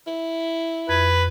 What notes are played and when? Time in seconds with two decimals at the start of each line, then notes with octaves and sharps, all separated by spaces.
0.07 E4
0.89 F2 B4 G#6